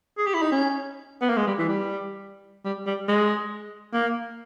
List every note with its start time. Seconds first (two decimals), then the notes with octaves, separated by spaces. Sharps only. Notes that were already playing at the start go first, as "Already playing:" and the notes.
0.18 G#4
0.27 G4
0.34 E4
0.42 D#4
0.52 C#4
1.22 B3
1.30 A#3
1.37 G#3
1.47 G3
1.59 E3
1.68 G3
2.65 G3
2.87 G3
3.08 G#3
3.94 A#3